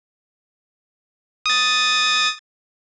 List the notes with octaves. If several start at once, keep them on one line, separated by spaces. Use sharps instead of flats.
D#6 A6